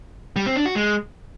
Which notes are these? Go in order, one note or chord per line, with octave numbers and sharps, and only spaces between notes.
G3
C4
D4
F#4
G#3